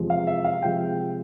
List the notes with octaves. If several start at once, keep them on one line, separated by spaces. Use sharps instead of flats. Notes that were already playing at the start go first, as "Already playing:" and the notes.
Already playing: E2 C3 F3 G#3
F5
E5
F5
C3 F3 G#3 G5